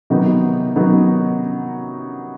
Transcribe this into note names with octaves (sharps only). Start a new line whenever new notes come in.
C3 D#3 F#3 B3 D#4
C3 D#3 F#3 B3 D#4